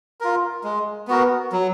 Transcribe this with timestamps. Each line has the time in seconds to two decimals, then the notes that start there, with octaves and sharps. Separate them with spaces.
0.20 F4 A#4
0.64 G#3
1.07 B3 F#4 A#4
1.52 F#3